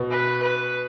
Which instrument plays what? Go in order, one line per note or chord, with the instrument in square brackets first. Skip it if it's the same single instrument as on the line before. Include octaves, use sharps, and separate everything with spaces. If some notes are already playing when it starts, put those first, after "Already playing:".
Already playing: [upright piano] B2
[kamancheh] B4
B4